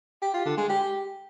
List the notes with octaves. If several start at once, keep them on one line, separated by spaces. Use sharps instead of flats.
G4
F4
D3
G#3
G4